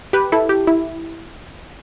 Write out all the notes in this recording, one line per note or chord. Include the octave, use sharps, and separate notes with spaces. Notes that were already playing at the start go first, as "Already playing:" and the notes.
G4 B4
E4 A4
G4
E4